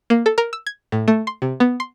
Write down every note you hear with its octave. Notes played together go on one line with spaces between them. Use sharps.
A#3
A4
A#4
E6
G#6
A2
A3
C6
C3
B3
C6